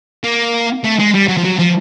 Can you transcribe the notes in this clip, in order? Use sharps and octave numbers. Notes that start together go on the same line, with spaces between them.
A#3
A3
G#3
G3
F#3
F3
F#3
F3